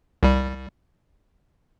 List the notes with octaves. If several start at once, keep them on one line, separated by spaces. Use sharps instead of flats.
C2 G3